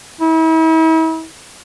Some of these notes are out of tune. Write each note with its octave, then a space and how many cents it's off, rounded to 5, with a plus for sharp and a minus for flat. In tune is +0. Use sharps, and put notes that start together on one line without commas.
E4 -40